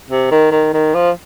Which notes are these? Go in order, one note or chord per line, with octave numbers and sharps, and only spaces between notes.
C3
D#3
D#3
D#3
F3